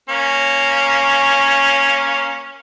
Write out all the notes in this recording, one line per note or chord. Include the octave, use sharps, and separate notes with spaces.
A#3 C#4